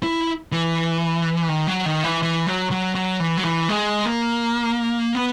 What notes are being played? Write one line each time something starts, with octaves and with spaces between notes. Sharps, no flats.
E4
E3
D#3
F#3
D#3
E3
E3
F#3
F#3
F#3
E3
F#3
E3
G#3
A#3
B3